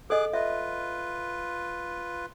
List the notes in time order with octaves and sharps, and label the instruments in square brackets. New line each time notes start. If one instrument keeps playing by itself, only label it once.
[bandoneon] G#4 D6 F#6 [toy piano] A4 D#5
[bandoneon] F4 B4 [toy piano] E5